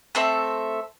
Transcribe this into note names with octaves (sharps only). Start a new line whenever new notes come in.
A3 C4 A4 E5